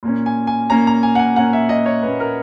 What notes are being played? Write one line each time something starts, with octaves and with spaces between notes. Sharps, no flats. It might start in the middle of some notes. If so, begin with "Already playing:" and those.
A#2 A#3 C#4
G#5
G#5
A#2 A#3 C#4 A#5
A#5
G#5
F#5
G#5
A#2 A#3 C#4 F#5
E5
D#5
C#5
A#2 A#3 C#4 B4
A#4